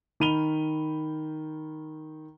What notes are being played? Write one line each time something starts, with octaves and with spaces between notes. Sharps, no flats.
D#3 B5 D#7 F7 G7